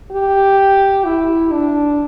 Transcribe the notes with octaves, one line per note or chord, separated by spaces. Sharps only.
G4
E4
D4